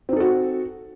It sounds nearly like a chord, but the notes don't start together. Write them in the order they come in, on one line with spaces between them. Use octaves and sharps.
C4 D#4 A4 F#4